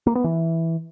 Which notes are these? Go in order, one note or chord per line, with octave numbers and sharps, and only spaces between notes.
A#3
B3
E3